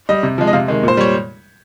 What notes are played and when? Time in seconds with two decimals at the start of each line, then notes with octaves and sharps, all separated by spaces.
0.09 G3 D#5
0.23 C3
0.38 F3 G#3
0.47 D#5
0.53 C3 F5
0.68 D#3 G#3
0.83 A#2 C5
0.97 G3 C#5